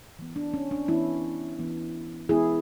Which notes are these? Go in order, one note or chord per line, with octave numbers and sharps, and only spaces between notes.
E3 B3
D4
C#4
D4
E3 B3 C#4 E4
E3 B3
E3 B3 E4 G#4